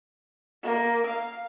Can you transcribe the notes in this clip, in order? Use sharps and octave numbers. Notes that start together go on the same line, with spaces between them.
A#3
F5